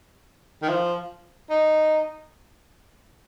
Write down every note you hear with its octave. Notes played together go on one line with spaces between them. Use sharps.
D#3
F3
D#4